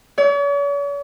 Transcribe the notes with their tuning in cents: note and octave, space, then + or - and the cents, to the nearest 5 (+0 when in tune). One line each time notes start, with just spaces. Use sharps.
C#5 +45